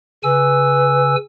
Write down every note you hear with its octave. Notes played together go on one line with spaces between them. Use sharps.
C#3 B4 G#5 E6